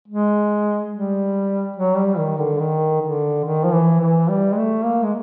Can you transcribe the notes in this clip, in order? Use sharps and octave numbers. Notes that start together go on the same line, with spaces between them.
G#3
G3
F#3
G3
D#3
D3
D#3
D3
D#3
F3
E3
E3
G3
G#3
A3
A#3
G#3